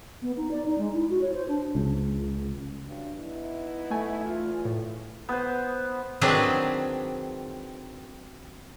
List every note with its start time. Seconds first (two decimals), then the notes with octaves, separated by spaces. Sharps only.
0.22 B3
0.37 D#4
0.51 D5
0.66 D#4
0.78 G#3
0.94 E4
1.10 F#4
1.21 C#5
1.34 C5
1.48 D4
1.75 C#2
2.86 G2 F#3 D4
3.19 B3 D#4 E4
3.91 A3 G#5
4.24 E2 F4
4.65 A2
5.29 B3 C5
6.21 D#3 F#3 C4 D4 G#4 B4